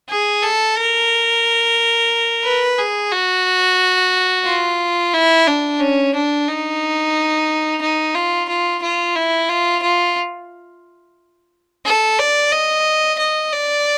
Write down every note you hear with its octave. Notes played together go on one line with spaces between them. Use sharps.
G#4
A4
A#4
B4
G#4
F#4
F4
E4
D4
C#4
D4
D#4
D#4
F4
F4
F4
E4
F4
F4
A4
D5
D#5
D#5
D5